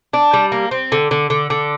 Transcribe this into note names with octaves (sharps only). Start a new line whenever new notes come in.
D4
G3
A#3
C4
D3
D3
D3
D3